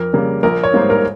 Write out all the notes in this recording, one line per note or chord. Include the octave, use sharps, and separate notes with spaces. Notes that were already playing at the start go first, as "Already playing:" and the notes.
Already playing: F2 A#4
C#3 G3 A#3
A#1 A#4
C#5
G#2 G3 A#3 C5
A#4